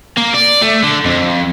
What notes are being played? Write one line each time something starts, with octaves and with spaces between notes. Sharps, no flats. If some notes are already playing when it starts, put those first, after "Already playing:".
A#3
D5
A3
D3
F2